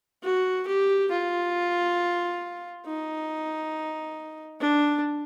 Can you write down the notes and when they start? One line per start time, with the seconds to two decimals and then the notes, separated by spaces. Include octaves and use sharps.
0.23 F#4
0.68 G4
1.11 F4
2.86 D#4
4.61 D4